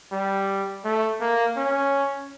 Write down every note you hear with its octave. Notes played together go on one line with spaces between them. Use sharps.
G3
A3
A#3
C#4